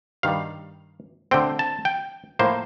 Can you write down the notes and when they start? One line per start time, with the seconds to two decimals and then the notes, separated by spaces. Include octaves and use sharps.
0.23 G2 D#3 G3 F5
1.31 D3 A3 C4 G5
1.59 A5
1.85 G5
2.39 A2 F3 A#3 C5